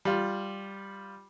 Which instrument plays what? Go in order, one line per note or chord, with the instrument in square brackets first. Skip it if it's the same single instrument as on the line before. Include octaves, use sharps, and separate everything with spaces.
[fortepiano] G3 F4